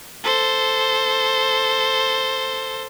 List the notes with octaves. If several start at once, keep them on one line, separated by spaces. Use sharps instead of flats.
A4 C5